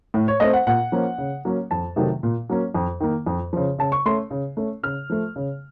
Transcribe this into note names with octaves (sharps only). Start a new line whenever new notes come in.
A2
C#5
A3 C4 D#5
F#5
A#2 F#5
F3 A#3 C#4
C#3
F#3 A#3 C#4
F2 A5
C3 D#3 F#3 A3
A#2
F#3 A#3 C#4
F2
D#3 A#3
F2
C#3 F3
C#3 A5
C#6
A3 C#4 C6
C#3
A3 C#4
C#3 F6
F3 A3
C#3